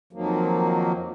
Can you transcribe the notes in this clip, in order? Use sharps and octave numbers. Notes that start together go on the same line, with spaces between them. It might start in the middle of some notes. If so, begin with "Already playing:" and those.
F2 D#3 F3 F#3 A#3